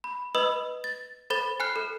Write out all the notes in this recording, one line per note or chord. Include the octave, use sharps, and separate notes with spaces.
B5
B4 D#5 B5 D#6 E6
A6
A4 C5 B5 A6 G7
G#5 B5 F6 F#6 C7
A4